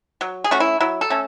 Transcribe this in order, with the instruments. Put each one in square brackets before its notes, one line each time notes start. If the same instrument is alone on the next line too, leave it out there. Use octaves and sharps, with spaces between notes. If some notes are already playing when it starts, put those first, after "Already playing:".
[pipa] F#3
G#4
A3 C#4 F#4
E4
F#3 E4
A4
A3 C#4